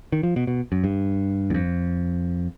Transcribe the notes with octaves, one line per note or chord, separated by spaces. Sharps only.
D#3
F3
B2
B2
F#2
G2
E2
F2